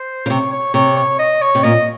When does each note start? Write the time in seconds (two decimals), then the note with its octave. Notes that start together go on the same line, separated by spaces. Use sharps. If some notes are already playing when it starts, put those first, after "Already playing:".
Already playing: C5
0.26 C#3
0.30 C3 C#5
0.52 C#5
0.74 C3 C#5
0.97 C#5
1.19 D#5
1.42 C#5
1.55 C3
1.64 A#2 D#5